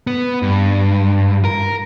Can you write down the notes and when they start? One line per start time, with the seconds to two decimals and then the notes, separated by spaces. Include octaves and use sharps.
0.07 B3
0.42 G2
1.45 A#4